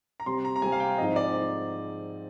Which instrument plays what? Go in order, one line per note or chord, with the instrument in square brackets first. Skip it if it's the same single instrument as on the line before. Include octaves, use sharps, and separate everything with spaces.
[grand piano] A#5
[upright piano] C3 G3 C4 G4 [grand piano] C6
[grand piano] A#5
A#5
[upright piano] C3 G3 C4 G4 [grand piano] G#5
[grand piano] F5
G5
[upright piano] G#2 F3 C4 [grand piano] D#5
[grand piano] D5